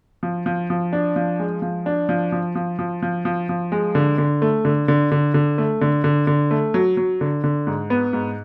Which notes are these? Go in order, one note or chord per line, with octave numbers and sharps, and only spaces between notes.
F3
F3
F3
D4
F3
G#3
F3
D4
F3
F3
F3
F3
F3
F3
F3
G#3
D3
D3
A3
D3
D3
D3
D3
A3
D3
D3
D3
A3
F#3
F#3
D3
D3
G#2
B3
G#2